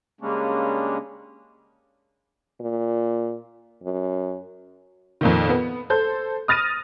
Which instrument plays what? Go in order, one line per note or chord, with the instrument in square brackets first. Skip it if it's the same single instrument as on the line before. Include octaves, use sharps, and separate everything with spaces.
[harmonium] C#3 G3 G#3 A#3 C#4 D4
[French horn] A#2
F#2
[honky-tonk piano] F2 A#2 D#3
B3
A4 C5 G6
D#6 F6 A6 A#6 D#7